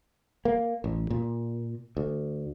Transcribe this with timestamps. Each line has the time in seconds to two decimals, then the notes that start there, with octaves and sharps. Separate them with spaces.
0.45 A#3
0.84 A1
1.10 A#2
1.97 D2